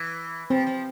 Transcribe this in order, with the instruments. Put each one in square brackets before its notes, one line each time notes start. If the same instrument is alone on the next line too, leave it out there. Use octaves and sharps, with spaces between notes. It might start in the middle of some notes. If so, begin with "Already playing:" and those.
Already playing: [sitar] E3
[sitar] F3 [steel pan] C4
[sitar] F3